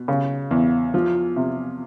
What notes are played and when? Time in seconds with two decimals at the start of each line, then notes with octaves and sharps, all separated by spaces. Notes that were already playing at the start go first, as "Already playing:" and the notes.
Already playing: B2
0.08 C#3
0.51 E2
0.94 F3
1.36 C3